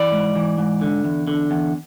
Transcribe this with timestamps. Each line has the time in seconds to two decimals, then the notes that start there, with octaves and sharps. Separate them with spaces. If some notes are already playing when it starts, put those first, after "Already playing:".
Already playing: E3 D5
0.12 G#2
0.36 E3
0.58 G#2
0.81 D3
1.04 E2
1.27 D3
1.51 E2